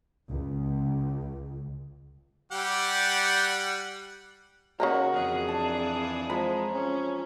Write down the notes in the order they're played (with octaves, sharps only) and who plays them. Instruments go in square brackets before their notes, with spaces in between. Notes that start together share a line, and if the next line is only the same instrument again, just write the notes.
[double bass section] C#2
[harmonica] G3 G4 F#5
[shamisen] C#3 A#3 D#4 [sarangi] F#4 [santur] A#4
[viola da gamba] F2 E3 G#4
[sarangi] D4 [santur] A5
[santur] F3 A#5 B5 [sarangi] G#3
[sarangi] C#4